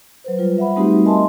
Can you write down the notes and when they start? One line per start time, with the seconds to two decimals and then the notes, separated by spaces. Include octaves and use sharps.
0.24 F#3 B4 C5
0.38 G3 F4 B4
0.58 E5 F#5 B5
0.76 G3 A3 C4 D#4 F#4 G4
1.05 A#4 D#5 E5 G#5 A5 C6